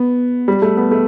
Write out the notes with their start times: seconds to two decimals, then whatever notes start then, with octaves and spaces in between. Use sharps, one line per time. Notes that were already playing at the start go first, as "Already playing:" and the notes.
Already playing: B3
0.48 G3
0.62 A3
0.77 B3
0.91 A3